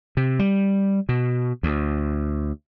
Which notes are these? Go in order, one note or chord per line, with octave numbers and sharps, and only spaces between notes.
C3
G3
B2
D2